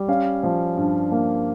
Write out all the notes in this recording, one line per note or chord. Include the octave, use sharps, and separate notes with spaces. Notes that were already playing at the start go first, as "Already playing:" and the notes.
Already playing: G3
C#4 F5
F3
G2
A#3